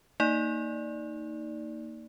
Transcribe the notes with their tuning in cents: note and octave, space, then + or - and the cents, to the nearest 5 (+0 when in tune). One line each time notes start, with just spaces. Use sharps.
A#3 -15 D#4 +0 D5 +0